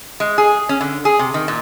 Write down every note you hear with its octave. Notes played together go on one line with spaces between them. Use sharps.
G#3
G#4
C#4
D3
G#4
C3
D#3
A#2